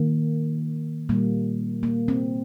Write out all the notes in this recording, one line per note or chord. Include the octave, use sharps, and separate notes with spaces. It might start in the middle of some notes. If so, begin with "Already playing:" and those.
Already playing: D#3 A#3
A#2 G3 A#3
A#3
C4